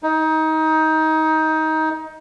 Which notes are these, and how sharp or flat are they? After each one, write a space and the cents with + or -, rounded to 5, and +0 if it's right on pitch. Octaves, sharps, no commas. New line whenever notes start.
D#4 +20